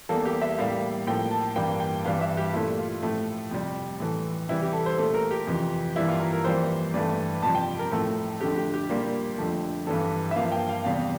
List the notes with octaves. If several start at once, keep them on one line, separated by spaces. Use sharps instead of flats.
E2 E3 G3 A#3 A4
G4
E5
A2 G3 A#3 F5
A2 F3 A#3 G5
A5
G2 E3 G3 A#3 G5
G5
G2 E3 G3 F5
E5
G4
A#2 A3 E4
F4
A2 F3 A3
F2 C3 G3
A2 E3 A3
C3 E3 G3 E4
G4
A4
C5
A#2 A3 A4
A#4
G4
F2 C3 E3
G2 E3 G3 A#3 E4
F4
A#4
A#4
F2 E3 G3 A#3 C5
G2 E3 A3 D5
F2 C3 G3 A5
G5
A#4
A2 F3 A3 A4
F2 D3 A3 G4
G4
G4
A#2 G3 A#3
F2 D3 F3 A3
G2 E3 G3 A4
E5
G2 F3 A#3 F5
G5
F5
E2 C3 G3 F5